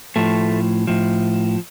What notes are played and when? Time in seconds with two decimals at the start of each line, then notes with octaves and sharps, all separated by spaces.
0.16 A2 F3 A3
0.87 A2 F3